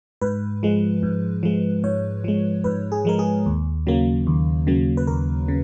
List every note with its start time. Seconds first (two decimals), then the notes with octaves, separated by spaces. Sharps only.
0.22 G#2 B4
0.63 F3 G#3
1.03 G#2
1.43 F3 G#3
1.84 G#2 C#5
2.24 F3 G#3
2.64 G#2 B4
2.92 G#4
3.05 F3 G#3 A#4
3.19 G#4
3.46 D#2
3.87 C#3 F#3 A#3
4.27 D#2
4.67 C#3 F#3 A#3
4.97 B4
5.07 D#2 A#4
5.48 C#3